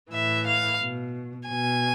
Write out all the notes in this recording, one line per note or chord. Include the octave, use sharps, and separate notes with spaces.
A2 E3 E5
F5
B2
B2 G#5